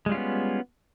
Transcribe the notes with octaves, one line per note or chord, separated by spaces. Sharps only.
G3 G#3 B3 C#4 F4